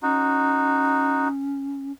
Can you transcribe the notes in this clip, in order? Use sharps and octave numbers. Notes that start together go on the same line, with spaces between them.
C#4 D#4 F#4